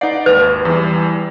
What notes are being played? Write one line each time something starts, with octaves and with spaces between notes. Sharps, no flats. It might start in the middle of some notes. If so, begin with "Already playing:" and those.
D#4 B4 D5 F#5
G#1 D#2 B4
E2 E3 G3